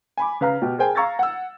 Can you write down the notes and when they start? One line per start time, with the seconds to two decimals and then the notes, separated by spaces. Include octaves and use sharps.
0.17 G#5 B5 D6
0.41 C#3 B4 F5 A#5 F6
0.62 B2 G4
0.78 G#4 A#4 C5 G5 G#5
0.95 F5 A#5 C#6 E6 G#6 A6
1.19 F#5 E6